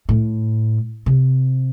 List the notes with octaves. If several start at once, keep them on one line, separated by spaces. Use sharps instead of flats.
A2
C3